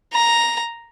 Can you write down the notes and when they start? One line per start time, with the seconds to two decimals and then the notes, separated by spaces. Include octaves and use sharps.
0.14 A#5